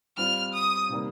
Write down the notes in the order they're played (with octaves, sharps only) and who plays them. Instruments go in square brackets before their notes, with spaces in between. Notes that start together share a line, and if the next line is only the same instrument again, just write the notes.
[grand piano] G3 C4 F4 [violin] F6
[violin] D#6
[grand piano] C3 D#3 G3 A#3